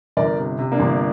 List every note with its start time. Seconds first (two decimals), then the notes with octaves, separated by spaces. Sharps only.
0.17 G1 A#4 D5
0.38 C3
0.59 C3
0.72 A#3 D4
0.80 G1